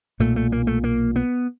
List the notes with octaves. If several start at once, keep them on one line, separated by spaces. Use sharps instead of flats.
B1 A#2 A3
A3
A#3
A3
A#3
B3